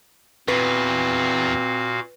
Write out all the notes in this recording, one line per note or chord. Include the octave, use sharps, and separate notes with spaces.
E2 A#2 C4 F#4 B4 F5